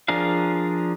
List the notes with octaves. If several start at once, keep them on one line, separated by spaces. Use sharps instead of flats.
F3 D4 G#4 A#4 F5